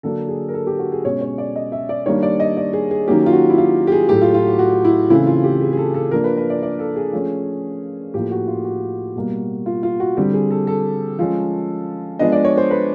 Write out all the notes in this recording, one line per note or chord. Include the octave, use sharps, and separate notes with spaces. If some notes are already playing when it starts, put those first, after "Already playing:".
D3 F#3 A#3 D4 A4
G#4
A#4
A4
G4
F#4
G#4
B2 G#3 C#4 C#5
C#5
D5
D#5
E5
D5
D#3 G3 A#3 D4 C#5
D5
D#5
D5
G#4
G#4
D#3 F#3 A#3 C#4 G4
F4
F#4
E4
F4
G4
G#4
A2 F#3 A3 G4
F4
F4
F#4
F#4
E4
C#3 E3 A3 C4 E4
F4
G4
G#4
G#4
A4
A4
F3 A#3 D4 A#4
B4
B4
D5
D5
A4
G#4
F3 A3 C#4
A2 F3 A#3 G4
F#4
F4
F#4
B2 G3 A#3
F4
F4
F#4
D3 G3 C4 G4
G#4
A4
A4
F3 G#3 C#4
F3 G#3 B3 D4 D#5
D5
C#5
C5
B4